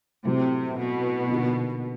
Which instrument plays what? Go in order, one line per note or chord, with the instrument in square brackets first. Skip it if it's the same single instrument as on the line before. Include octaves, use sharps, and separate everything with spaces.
[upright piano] A2 F#3 A3 C4 [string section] C3
[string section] B2
[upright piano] D3 F3 A#3 D#4 F#4